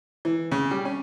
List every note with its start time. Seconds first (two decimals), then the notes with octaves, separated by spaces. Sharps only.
0.25 E3
0.52 C#3
0.71 G3
0.85 C#4